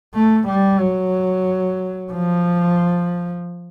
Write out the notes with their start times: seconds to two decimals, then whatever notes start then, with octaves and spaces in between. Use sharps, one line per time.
0.15 A3
0.48 G3
0.81 F#3
2.12 F3